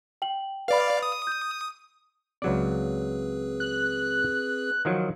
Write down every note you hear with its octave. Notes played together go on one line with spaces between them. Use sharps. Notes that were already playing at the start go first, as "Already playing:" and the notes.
G5 F#7
B4 D5 F5 B5
D#6
G6
C#2 F#3 C4 G#4 B4 D5
F#6
D#3 F3 F#3